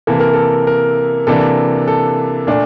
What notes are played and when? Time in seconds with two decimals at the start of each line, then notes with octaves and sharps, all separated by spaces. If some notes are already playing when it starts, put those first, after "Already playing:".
0.07 C3 E3 A#3 A4
0.20 A#4
0.34 A4
0.67 A#4
1.27 C3 E3 A#3 D4 A4
1.88 A4
2.47 A#2 A3 D4